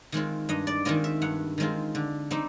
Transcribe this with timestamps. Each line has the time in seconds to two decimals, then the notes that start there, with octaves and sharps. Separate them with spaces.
0.12 D#3 G#3 C4 F4
0.49 G2 D#5
0.67 D5
0.85 D#3 G#3 C4 F4 D#5
1.04 E5
1.22 G2 F#5
1.58 D#3 G#3 C4 F4
1.95 D3
2.31 G3 C4 D#4